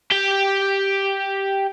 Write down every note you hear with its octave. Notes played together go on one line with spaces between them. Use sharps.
G4 G5